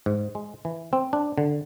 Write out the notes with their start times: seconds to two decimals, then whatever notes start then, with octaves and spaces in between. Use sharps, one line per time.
0.06 G#2
0.35 G#3
0.65 E3
0.93 C4
1.13 D4
1.38 D3